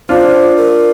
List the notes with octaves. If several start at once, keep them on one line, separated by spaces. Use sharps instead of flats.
D4 F4 C5
A#4